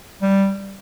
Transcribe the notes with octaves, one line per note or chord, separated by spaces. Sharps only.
G3